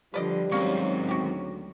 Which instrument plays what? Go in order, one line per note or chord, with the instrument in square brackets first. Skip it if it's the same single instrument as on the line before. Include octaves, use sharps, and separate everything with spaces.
[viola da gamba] D3 F3 [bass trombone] G3 [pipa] B4 D5 D#5
[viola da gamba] F#3 C#4 [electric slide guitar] G#3 C4 D#4 [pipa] A#3 F#4
[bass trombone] D2 [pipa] F#4 G4